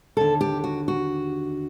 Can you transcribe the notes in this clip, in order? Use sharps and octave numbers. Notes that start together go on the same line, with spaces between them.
D#2 D3 A4
G4
F#4
F#4